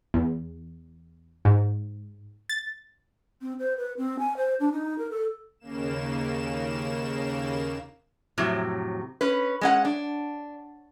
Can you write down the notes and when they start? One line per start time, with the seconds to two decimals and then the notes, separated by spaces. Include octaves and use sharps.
0.14 E2
1.45 G#2
2.49 A6
3.42 C4
3.59 C5
3.77 B4
3.97 C4
4.19 G#5
4.37 C5
4.60 D4
4.72 D#4
4.98 A#4
5.11 A4
5.60 D#2 C#3 A#3 E7
8.38 F2 A2 C3 F#3
9.21 C#4 B4
9.61 G#3 C#4 F#5
9.85 D4